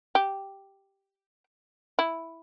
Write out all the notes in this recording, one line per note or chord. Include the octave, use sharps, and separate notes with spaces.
G4
E4